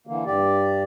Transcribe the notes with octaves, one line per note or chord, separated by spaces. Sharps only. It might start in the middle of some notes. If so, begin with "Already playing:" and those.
D3 E3 A#3
G2 G4 D5